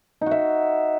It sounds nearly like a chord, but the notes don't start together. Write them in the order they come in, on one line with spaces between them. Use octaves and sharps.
D#4 F#4 E5